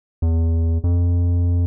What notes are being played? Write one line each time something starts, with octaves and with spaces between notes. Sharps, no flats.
E2
F2